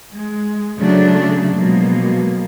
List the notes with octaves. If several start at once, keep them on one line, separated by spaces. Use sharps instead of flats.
G#3
C#3 F#3 A3 D4
B2 F3 F#3 G#3 A#3